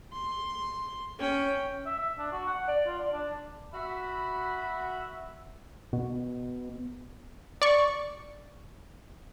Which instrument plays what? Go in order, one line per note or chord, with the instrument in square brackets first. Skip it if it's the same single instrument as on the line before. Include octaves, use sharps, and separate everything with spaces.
[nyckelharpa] C6
C#4 G5
[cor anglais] E5
E5
D4
F#4
F#5
D5
F4
D5
D4
[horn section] F#4 E5 [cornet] B5
[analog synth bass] B2
[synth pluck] D5 C#6